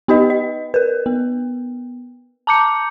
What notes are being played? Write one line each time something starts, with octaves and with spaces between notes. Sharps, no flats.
B3 D#4 G4 B4 D#5
D#5
A#4 B4
B3
A5 A#5 D6 G6 C#7